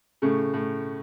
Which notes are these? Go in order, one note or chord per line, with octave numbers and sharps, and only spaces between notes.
A2 C#3
A2